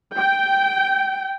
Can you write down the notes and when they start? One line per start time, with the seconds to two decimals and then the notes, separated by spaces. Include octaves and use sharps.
0.15 G5